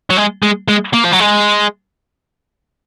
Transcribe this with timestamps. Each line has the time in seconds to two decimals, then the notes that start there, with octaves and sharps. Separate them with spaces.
0.10 F#3
0.17 G#3
0.43 G#3
0.69 G#3
0.94 A#3
1.05 F3
1.12 F#3
1.20 G#3